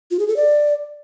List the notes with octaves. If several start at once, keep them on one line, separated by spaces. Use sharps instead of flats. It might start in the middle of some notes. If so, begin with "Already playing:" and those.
F4
G#4
A4
D5